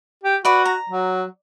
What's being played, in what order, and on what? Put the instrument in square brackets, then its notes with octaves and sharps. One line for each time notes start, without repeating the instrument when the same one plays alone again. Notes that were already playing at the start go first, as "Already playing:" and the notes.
[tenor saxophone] G4
[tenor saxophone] F#4 [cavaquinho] B4 D5 B5
[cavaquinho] A#5
[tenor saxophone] F#3